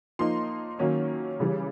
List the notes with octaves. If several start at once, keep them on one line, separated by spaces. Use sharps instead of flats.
F3 A#3 D#4 C6
D#3 F#3 A#3 C#4
C#3 E3 G3